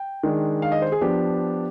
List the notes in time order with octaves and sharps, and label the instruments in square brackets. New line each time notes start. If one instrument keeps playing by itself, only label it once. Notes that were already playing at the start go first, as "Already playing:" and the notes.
Already playing: [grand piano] G5
D#3 G#3 D4
F5
D#5
C5
G#4
F3 B3 D4 G4